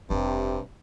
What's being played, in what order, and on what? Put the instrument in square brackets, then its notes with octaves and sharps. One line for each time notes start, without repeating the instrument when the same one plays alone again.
[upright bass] F1 [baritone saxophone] G2 [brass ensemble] C3